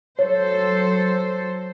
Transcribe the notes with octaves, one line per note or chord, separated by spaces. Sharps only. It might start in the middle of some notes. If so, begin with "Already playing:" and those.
F#3 A4 C5 C#5